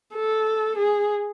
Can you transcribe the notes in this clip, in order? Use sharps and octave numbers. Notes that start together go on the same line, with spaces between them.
A4
G#4